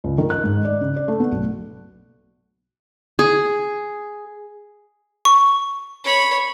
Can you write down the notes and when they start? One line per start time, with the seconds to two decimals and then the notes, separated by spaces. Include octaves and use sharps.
0.04 C#2
0.18 D#3
0.30 F#6
0.44 G#2
0.65 D5
0.81 C#3
0.96 D5
1.08 A3
1.20 B3
1.32 B1
3.19 G#4
5.25 C#6
6.04 C#5 B5